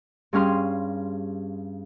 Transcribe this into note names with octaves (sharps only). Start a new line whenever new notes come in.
G2 C#4 G#4 F5 C6